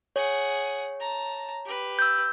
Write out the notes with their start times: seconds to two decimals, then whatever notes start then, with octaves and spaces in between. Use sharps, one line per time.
0.16 G#4 C#5 F#5
1.00 A5 A#5
1.65 G4 B4
1.99 E6 G6